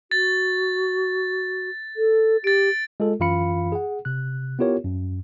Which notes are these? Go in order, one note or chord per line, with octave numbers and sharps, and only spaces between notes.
F#4 A6
A4
G4 A6 D7
G#3 F4 A4
F#2 E3 F4 F5 B5 C#7
G#4 F#5
C3 F#6
B3 E4 F4 G4 A#4 C#5
F#2